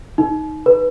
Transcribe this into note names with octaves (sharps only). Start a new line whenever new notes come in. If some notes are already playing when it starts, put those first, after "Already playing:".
D#4
B4